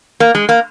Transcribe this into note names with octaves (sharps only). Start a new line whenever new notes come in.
A#3
G#3
A#3